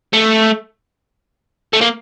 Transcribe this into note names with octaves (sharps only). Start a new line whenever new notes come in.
A3
A3
A#3